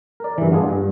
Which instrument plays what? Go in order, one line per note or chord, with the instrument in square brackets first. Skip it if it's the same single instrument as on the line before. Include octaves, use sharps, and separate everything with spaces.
[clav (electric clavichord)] A#4 D5
G2 E3
B3 D4 F4 G#4
G2